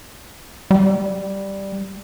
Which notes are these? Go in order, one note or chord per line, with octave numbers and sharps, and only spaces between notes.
G3